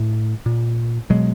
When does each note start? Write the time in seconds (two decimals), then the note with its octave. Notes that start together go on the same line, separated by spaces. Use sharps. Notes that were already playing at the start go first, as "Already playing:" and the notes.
Already playing: A2
0.46 A#2
1.10 B2 F#3 G#3